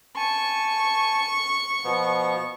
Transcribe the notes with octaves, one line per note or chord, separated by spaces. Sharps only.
G#5 A5 C#6
B2 F3 B3